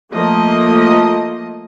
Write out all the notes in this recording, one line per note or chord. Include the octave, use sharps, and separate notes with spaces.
F3 A3 A#3 D#5